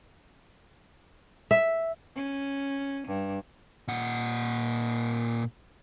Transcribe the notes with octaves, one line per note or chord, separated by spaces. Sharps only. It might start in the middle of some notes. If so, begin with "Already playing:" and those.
E5
C#4
G2
A#2 F#5